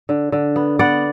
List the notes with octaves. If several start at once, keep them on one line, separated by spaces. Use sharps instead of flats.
D3
D3
B3
B3 D5 F#5